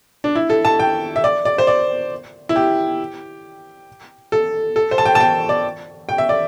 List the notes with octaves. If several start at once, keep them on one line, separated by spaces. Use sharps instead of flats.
D4
E4
A4
A5
G5
E5
D5
D5
C5
D5
E4
G4
A4
A4
C5
A5
G5
A5
G5
D5
G5
E5
D5